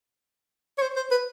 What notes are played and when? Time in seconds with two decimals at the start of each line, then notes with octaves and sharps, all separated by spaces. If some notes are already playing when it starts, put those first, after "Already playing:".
0.78 C#5
0.82 C5
0.96 C5
1.11 B4